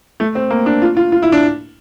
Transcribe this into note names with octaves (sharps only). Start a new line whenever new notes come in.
A3
C4
A#3
D4
F4
F4
F4
E4
D4